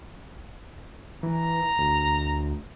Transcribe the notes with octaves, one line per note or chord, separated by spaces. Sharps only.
E3 A#5
D2